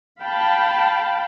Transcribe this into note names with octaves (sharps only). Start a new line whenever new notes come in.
F5 G5 A5 B5